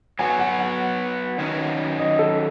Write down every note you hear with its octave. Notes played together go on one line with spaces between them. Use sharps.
F#3 B3 F#4 C#5 G#5
F#5
F#5
D#3 F#3 C#4
D#5
A4